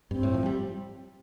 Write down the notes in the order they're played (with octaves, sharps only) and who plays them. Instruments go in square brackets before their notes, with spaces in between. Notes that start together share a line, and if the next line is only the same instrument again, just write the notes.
[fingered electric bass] G2 [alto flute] C4
[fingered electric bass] A2
F3
G3